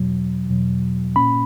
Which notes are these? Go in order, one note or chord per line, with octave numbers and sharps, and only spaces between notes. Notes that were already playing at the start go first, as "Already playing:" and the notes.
Already playing: E2 B2 F#3
E2 B2 F#3
A#2 A#3 C#4 B5